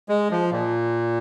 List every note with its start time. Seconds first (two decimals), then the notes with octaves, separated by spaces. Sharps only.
0.09 G#3
0.31 F3
0.52 A#2